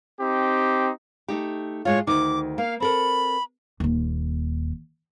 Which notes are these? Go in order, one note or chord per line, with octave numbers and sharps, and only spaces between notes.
C4 D#4 G4
A3 D#4 G4
A2 G#3 F4 C#5
D2 D#3 D#4 D6
A#3 F5
C4 A4 A#4 B5
D#1 D#2